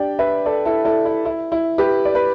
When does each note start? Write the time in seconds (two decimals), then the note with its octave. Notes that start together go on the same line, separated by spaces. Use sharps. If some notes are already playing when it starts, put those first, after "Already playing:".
Already playing: D4 G4 D5 G5
0.19 B4 E5
0.46 A4 D5
0.65 E4 A4
0.85 E4 A4
1.05 E4
1.25 E4
1.52 E4
1.78 G4 B4
2.05 D5
2.15 B4